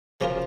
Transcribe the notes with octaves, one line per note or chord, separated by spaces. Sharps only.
C#3 F3 F#3 C#4 F4 A#4